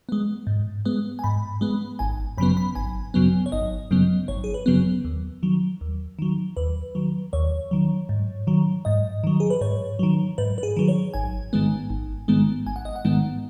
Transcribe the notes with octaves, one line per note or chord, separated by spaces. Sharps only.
G#3 B3
G#2
G#3 B3
G#5
G#2 B5
G#3 B3
G#1 G#5
F#2 C#3 F#3 B3 B5
B5
G#1 G#5
F#2 C#3 F#3 B3
C#5
G#1 D#5
F#2 C#3 F#3 B3
G#1 C#5
G#4
B4
F#2 C#3 F#3 B3
D#2
D#3 F#3
D#2
D#3 F#3
D#2 B4
D#3 F#3
D#2 C#5
D#3 F#3
G#2
D#3 F#3
G#2 D#5
D#3 F#3
G#4
B4
G#2 C#5
D#3 F#3
G#2 B4
B4
G#4
D#3 F#3
C#5
G#1 G#5
G#2 D#3 G#3 B3
G#1
G#2 D#3 G#3 B3
G#1 G#5
F#5
D#5
F#5
G#2 D#3 G#3 B3